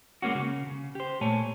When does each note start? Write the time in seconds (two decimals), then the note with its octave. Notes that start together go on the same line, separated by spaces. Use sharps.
0.22 G#3 A#3 C#4 F#4
0.35 C#3
0.67 C#3
0.95 G4 C5
1.21 A#2 A3 C#5 G#5 A5